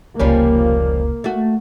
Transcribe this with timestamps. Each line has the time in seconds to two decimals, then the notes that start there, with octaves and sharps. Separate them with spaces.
0.20 F1 C#2 F3 G3 A#3 C#4
1.24 A3 F#4